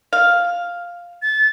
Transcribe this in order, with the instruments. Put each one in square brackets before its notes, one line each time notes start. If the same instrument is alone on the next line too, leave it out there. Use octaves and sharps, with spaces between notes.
[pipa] F5
[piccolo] A6